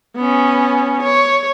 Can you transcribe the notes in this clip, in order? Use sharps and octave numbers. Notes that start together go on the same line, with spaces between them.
B3 C#4
C#5